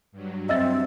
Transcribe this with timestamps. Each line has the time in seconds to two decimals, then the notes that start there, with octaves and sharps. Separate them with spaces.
0.12 G2 F#3
0.49 C4 D#5 E5 E6 A6